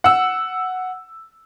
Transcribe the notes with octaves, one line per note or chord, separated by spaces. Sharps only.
F#5 E6